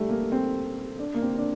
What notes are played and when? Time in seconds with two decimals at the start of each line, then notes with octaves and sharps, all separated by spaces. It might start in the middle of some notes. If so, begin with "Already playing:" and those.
Already playing: G3 A3
0.09 A#3
0.32 C4
0.99 D4
1.15 A#3
1.22 C4
1.38 D4